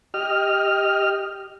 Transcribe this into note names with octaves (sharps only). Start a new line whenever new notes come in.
G4 D#5 F6